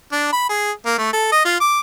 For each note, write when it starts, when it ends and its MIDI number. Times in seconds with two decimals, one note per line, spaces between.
0.12 0.28 62
0.32 0.47 83
0.49 0.71 68
0.86 0.94 58
0.98 1.09 57
1.13 1.30 69
1.32 1.41 75
1.45 1.59 65
1.60 1.80 86